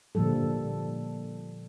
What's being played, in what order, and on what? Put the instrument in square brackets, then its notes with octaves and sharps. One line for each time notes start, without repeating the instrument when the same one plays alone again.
[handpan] A#2 D3 F3 G3 A4